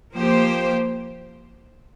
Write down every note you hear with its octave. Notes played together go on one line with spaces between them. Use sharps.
F3 A#3 G4 C5